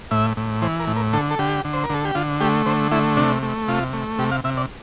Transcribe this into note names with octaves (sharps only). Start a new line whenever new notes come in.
A2 E5
A2
E3 C5
A#4
A2
A#4
D3 A4
A4
D3 G4
D3
C5
A#4
D3 A4
G4
D3 F4
A3 G4
D3 C5
A3 E4
C3 D4
A3
C3 F4
A3
C3 G4
F5
C3 E5
D5